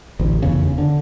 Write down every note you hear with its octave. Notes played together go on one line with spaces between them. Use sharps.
A1 D2
F1 E2 C#3
D3